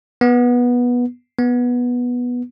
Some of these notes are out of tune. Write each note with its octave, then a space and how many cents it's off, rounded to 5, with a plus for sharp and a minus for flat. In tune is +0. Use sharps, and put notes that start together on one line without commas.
B3 -15
B3 -10